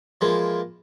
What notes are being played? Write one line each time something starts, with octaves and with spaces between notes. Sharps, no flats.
E3 F3 G#3 A#3